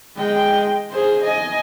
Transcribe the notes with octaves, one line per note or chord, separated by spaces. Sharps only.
G#3 G5
G#4 C5
D#5 G#5